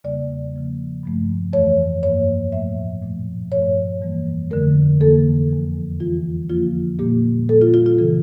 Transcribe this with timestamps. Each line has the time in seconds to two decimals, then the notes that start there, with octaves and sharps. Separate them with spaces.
0.04 E2 C#3 G3 A#3 D5
0.54 C#3 F3 A#3
1.03 G2 F3 A3
1.53 F2 E3 A3 C#5
2.03 G2 F3 A#3 C#5
2.52 A2 F3 A3 E5
3.02 A#2 F3 A3
3.52 G2 F3 A3 C#5
4.01 F2 E3 G3 A#3
4.51 F2 D3 F3 A3 A#4
5.01 F2 E3 A#3 A4
5.50 E2 D3 F3
6.00 E2 E3 G3 F4
6.49 F2 D3 F3 A#3 F4
6.99 A#2 G3 A#3 G4
7.49 A#2 G3 A#3 A4
7.61 F4
7.74 F4
7.86 F4
7.98 C#3 E3 A4